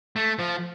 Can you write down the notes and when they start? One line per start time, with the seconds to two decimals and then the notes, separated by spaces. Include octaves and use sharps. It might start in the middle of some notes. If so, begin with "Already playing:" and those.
0.16 A3
0.39 F3